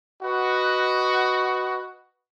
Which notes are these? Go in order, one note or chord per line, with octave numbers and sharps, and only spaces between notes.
F#4 B4 D#5 F#5